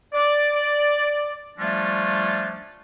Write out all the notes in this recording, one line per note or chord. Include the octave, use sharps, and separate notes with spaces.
D5
F3 G3 A3 C#4 D4 F4